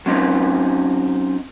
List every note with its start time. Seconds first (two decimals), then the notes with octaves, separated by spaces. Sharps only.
0.06 F#3 C4 C#4 D#4